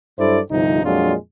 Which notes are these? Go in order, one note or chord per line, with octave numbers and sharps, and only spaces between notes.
G2 F#3 E4 A4 C5 D5
G1 C2 C3 F3 D#4
F2 A#2 F#3 G#3 D4 F4